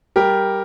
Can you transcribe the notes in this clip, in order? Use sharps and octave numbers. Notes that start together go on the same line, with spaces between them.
G3 G4 A#4